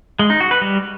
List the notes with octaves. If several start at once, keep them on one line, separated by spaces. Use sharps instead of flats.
G#3
D#4
F#4
B4
G3